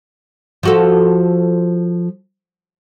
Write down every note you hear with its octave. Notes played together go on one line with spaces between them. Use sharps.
F3 F#4 A4